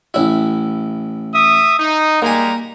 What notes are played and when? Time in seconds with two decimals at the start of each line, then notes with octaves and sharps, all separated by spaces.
0.14 A1 E4
1.34 E5 D#6
1.78 D#4
2.22 G3 G#3 A#3 G#5 A#5